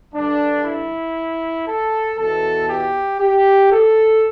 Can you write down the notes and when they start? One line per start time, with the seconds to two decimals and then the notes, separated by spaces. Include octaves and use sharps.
0.14 G2 D3 D4
0.64 E4
1.67 A4
2.17 E2 B2 A4
2.68 G4
3.20 G4
3.71 A4